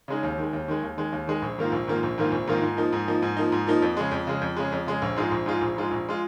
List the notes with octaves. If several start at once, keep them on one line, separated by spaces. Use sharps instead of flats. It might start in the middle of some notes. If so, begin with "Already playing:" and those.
C#3 G#3 D#4
D#2
D#3 G#3
D#2
D#3 G#3
D#2
D#3 G#3
D#2
D#3 G#3
A#1
G#2 D#3 A#3 F4
A#1
G#2 D#3 A#3 F4
A#1
G#2 D#3 A#3 F4
A#1
G#2 D#3 A#3 F4
G#2
F3 A#3 D#4
G#2
F3 A#3 D#4
G#2
F3 A#3 D#4
G#2
F3 A#3 D#4
F2
C#3 G#3
F2
C#3 G#3
F2
C#3 G#3
F2
C#3 G#3
A#1
G#2 G#3 F4
A#1
G#2 G#3 F4
A#1
G#2 G#3 F4
A#1
G#3 F4